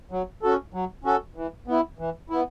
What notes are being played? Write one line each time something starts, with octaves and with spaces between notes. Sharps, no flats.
F#3
C#4 F#4 A4
F#3
C#4 F#4 A4
E3
B3 E4
E3
B3 E4